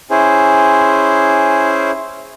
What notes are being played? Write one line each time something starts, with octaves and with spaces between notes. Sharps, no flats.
C#4 E4 G#4 C5